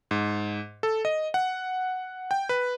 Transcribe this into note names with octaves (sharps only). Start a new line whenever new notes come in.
G#2
A4
D#5
F#5
G5
B4